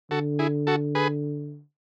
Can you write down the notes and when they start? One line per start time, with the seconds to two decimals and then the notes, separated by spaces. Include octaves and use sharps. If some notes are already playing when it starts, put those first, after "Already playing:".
0.11 D3 F#4 A4
0.39 E4 G#4
0.67 F#4 A4
0.95 G#4 B4